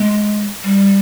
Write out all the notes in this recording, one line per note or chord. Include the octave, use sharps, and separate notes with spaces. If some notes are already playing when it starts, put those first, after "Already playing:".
Already playing: G#3
G3